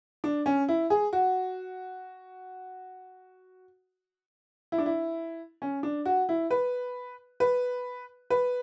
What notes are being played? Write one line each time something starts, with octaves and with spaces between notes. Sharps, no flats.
D4
C#4
E4
G#4
F#4
E4
D4
E4
C#4
D4
F#4
E4
B4
B4
B4